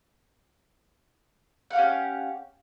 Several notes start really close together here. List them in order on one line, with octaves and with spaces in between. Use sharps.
F#5 F5 G4 C#4